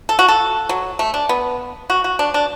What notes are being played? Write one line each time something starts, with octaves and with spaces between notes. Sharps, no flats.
A4
F#4
A4
F#3
A3
D4
B3
F#4
F#4
D4
D4